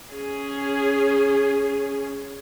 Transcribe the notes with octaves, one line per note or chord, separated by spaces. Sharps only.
C#4 G#4